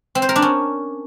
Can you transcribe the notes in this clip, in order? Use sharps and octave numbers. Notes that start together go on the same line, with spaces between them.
C4
C5
A#4
D4
C#4